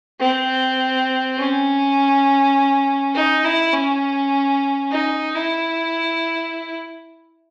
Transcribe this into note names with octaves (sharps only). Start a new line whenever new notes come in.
C4
C#4
D#4
E4
C#4
D#4
E4